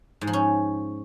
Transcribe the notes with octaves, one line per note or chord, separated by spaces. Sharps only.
G#2
F3
C#4